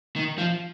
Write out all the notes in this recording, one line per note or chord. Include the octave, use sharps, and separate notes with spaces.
D#3
F3